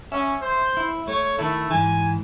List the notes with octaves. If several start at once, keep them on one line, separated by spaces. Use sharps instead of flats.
C#4 E5
C5
E4
A3 C#5
D#3 A3 E4
G#2 E3 G#5